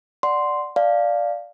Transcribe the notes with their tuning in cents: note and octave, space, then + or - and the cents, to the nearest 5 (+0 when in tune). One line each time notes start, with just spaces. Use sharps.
D5 +0 F#5 +0 C6 -5
D5 +0 F5 +0 A5 +0